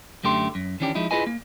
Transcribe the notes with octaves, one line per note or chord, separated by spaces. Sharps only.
F#2 D3 A3 G4 C6
F#2
D#3 E3 C#4 D4 G4
F3 G#3 D#4 E4
E4 F4 G#4 B4 D#5 G#5
A#3